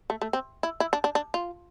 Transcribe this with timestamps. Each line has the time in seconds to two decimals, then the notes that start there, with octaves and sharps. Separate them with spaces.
0.10 A3
0.22 A3
0.33 C4
0.63 E4
0.80 E4
0.93 D4
1.04 D4
1.15 D4
1.34 F4